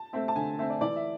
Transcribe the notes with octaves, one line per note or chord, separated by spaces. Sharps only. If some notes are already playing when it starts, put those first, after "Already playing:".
Already playing: A5
A3 C4 E5
A5
D3 G#5
A3 C4 E5
D5
E3 D5
E5